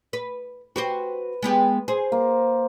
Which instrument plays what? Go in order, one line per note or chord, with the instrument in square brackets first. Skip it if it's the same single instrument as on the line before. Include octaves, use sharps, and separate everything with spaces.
[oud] B4
[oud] F#4 G4 C5 [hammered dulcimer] B4
[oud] G#3 B3 G4
[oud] G#4 [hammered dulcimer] C5
[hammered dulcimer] A#3